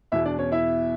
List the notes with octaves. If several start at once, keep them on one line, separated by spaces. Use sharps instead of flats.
E2 B2 E4 E5
D4 D5
C#4 C#5
E4 E5